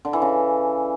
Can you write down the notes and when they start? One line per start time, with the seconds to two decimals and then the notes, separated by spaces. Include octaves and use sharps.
0.05 D3
0.13 E3
0.22 C#3